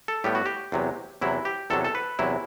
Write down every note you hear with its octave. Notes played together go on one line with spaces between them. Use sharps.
A4
A2 G3 B3 G4
F#4
G4
E2 C3 F#3
E2 C3 F#3 E4
G4
E2 C3 F#3 A4
A4
B4
E2 C3 F#3 E4